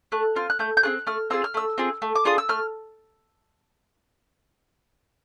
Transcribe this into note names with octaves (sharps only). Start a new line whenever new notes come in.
A3 F#6
C4 F4 F6
F#6
A3 G6
G6
C4 F4 G#4 F#6
A3 F6
C4 F4 G#4 E6
F6
A3 E6
C4 F4 G#4
A3
D6
D4 F4 G#4 D#6
E6
A3 F6